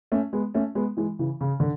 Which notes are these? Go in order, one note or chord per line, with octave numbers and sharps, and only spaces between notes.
A3 C#4
G#3 B3
A3 C#4
G#3 B3
E3 G#3
C#3 E3
C#3
D3